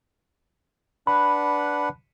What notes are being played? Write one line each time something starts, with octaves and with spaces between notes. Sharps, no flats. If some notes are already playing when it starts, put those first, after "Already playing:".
D4 B4 F#5 B5